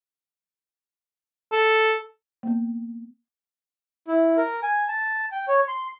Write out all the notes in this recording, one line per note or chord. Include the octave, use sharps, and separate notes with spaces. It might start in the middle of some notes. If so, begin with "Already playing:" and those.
A4
A#3 B3
E4
A#4
G#5
A5
G5
C#5
C6